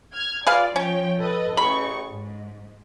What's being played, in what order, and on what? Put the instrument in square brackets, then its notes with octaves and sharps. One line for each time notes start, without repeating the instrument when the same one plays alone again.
[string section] F6 G#6
[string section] F4 D5 [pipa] G#4 B4 F5
[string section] F3 C#5 G5 [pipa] C#4
[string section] A4 B4 D#5
[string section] A1 G#4 C#6 [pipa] B5
[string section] G#2